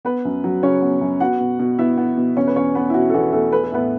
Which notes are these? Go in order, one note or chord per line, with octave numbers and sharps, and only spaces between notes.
B3 B4
F#2
F#3
C#3 C#4 C#5
B3
F#2
B3 F#4 F#5
B2
B2
B3 E4 E5
B3
B2
E2 C#4 C#5
B4
E2 C#4 C#5
B3 B4
E4
B2 F#4
A4
E2 F#4
E2 A3 A4
A3 B4
A4
A2 B3 B4